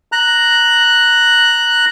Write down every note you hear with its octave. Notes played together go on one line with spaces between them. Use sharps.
A#5 F#6